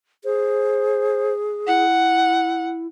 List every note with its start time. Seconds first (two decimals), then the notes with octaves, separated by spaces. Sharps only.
0.24 G#4 C5
1.67 E4 F#5